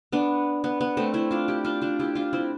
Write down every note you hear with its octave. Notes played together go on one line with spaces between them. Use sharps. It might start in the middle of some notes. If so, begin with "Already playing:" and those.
B3 D4
B3
B3
A3 C4
C4 E4
D4 F4
E4 G4
D4 F4
D4 F4
E4 G4
D4 F4
C4 E4